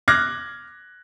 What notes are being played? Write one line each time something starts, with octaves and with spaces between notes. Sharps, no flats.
D6 F6 F#6 G#6 A#6